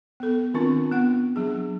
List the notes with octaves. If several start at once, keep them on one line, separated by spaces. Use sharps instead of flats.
B3 A4
D#3 C4 D4 F4
B3 F#5
F#3 D4 G#4